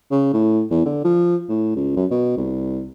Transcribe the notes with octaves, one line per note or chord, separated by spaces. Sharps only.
C#3
A2
E2
D3
F3
A2
C#2
F#2
B2
C2